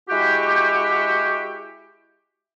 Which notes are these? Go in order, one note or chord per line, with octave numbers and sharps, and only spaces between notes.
G#3 E4 F#4 G4